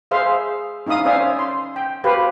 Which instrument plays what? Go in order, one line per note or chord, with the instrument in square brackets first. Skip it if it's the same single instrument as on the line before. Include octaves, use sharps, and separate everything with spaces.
[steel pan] G#4 C5 E5 F5 C6
C#4 D#4 E5 F5 D#6
C#4 C5 D5 E5 F5 G#5
C6
G5
F#4 G4 B4 C5 F5